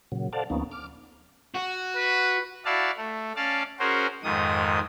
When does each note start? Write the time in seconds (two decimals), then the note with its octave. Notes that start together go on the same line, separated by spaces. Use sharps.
0.12 A#2 C#3 F#3
0.33 A4 C5 D5 F5 F#5 A5
0.50 D2 F3 A#3 B3 C#4 D#4
0.71 D6 F6
1.55 F#4
1.96 B4
2.65 E4 F#4 D5 F5 A5
2.97 A3
3.36 C#4 D5 F5 A5
3.79 C#4 F#4 G#4 A#4 C5
4.23 F2 G#2 D#3 D#6